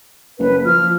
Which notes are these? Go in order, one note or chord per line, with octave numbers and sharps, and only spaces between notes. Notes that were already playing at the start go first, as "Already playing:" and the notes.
F#1 B4
F3 F6